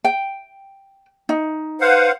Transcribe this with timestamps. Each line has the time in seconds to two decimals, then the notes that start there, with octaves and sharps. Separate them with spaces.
0.04 G5
1.29 D#4
1.81 B4 C5 F5 F#5